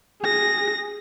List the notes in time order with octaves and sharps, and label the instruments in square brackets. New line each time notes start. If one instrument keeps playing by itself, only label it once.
[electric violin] G#4 A#6